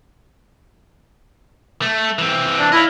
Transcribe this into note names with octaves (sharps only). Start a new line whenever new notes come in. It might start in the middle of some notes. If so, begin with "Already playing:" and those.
A3
E3 C4
D4
E4 D#5 F5